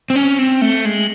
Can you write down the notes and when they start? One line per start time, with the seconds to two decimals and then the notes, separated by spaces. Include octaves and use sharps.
0.10 C4
0.16 C#4
0.39 C4
0.62 A3
0.85 G#3